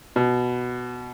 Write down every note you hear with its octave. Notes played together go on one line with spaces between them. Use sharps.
B2